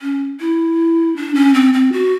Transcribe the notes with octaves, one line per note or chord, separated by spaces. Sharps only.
C#4
E4
D4
C#4
C4
C4
F#4